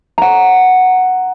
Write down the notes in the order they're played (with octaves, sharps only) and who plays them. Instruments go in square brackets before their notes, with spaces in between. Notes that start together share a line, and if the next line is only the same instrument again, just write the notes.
[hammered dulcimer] F#5 A#5